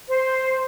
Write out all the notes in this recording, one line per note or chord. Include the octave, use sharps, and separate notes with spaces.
C5